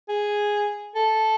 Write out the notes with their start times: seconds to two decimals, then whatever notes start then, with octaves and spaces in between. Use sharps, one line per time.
0.09 G#4
0.95 A4